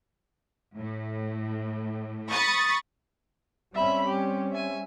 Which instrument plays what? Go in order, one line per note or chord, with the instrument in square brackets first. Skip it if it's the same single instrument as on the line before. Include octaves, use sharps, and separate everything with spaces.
[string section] A2
B5 C#6 D#6 A6
[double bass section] G3 C4 C#4 [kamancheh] E5 B5
[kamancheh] G4
E5 G#5